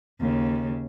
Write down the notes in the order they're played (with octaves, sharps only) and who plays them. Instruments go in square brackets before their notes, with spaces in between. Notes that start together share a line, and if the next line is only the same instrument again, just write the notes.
[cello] D#2 C#3